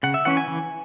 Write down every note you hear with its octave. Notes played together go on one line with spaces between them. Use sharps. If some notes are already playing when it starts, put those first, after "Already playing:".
C#3 F#5
E5
E3 C#4 E4 F#5
G#5
E3